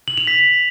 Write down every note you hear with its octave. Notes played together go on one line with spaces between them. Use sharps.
F#7
F7
B6